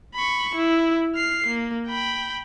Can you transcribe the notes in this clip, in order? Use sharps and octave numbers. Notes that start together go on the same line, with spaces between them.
B5 C#6
E4
F6 C7
A#3
G5 B5